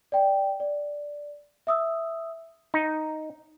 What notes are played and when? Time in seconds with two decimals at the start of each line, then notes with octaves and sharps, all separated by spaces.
0.12 D5 G5
0.60 D5
1.67 E5 D#6 E6
2.74 D#4